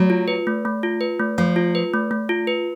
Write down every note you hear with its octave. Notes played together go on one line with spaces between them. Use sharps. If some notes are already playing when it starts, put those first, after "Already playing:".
Already playing: F#3 A3
F4
B4
A3
A3
F4
B4
A3
F3 A3
F4
B4
A3
A3
F4
B4